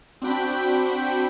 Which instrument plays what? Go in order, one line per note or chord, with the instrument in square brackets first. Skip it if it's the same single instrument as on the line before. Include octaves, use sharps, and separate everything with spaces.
[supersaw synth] C4 D4 F#4 G5 B5